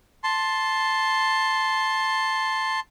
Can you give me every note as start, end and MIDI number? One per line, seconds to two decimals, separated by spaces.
0.24 2.80 81
0.24 2.80 84